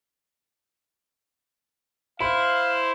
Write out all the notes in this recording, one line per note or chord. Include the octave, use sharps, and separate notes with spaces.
E4 C5 F5 B5 C6